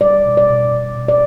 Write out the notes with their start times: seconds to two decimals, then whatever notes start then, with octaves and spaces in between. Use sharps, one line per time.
0.01 G3 D5
0.25 B2
0.37 D5
0.49 B2
0.72 B2
0.96 B2
1.08 D5